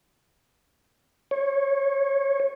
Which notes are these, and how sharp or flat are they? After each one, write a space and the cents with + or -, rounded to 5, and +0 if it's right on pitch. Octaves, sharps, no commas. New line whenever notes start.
C#5 -20